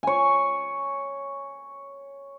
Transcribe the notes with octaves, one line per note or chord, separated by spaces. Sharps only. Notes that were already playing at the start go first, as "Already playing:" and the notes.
C#5 G#5